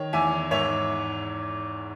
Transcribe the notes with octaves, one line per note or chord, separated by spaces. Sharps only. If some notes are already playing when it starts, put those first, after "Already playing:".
Already playing: D#3 C#5
E2 E5 G#5
G#2 C#5 E5